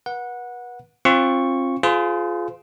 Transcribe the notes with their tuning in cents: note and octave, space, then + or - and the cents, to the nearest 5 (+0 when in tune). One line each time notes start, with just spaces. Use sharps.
B4 -35 F#5 -15
C4 +30 F4 +0 C#6 +0
F4 +0 G#4 +20 C5 -45